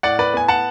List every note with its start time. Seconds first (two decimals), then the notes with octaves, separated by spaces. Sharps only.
0.03 A2 D5 F#5
0.19 B4 D5
0.34 B3 G#5
0.48 F#5 A5